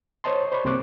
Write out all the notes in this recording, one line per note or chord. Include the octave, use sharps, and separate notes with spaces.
C5 C#5 D#5 A5 C6
C5 D5 B5 C#6
C2 C3 A#3 C5 D6 F#6